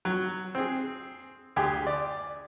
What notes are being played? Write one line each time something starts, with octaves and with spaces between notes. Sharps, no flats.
F#3
C4 G#4
D2 G4 G#4 G#5
D5